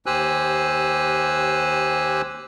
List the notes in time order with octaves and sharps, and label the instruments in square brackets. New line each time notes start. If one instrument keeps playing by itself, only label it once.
[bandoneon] D#2 G4 C5 G#5 E6 F#6